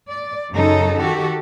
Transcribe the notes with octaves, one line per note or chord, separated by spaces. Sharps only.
D5
F#2 C#3 D#4 A4
D#3 F#4 G4 A4